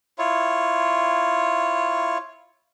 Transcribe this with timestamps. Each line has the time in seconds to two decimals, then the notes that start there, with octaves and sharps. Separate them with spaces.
0.18 E4 F4 C#5